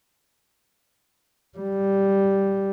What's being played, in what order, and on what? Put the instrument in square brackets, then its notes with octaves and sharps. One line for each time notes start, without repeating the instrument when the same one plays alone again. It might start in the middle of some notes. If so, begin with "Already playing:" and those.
[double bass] G3